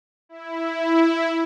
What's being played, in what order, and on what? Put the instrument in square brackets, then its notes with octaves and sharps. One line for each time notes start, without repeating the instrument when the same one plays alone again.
[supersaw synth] E4